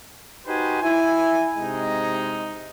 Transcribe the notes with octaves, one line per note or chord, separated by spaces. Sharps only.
D#4 F#4 G4 B4 C5 G#5
E4 G#5
C3 G#3 D#4